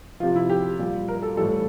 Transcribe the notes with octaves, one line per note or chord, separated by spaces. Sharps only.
C3 F3 F4
E4
G4
A#2 G3
A#4
A4
A2 E3 G3 A4